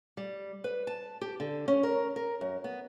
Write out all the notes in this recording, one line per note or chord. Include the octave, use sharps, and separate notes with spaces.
G3
B4
A5
G4
D3
C#4
A#4
A#4
F#2
B3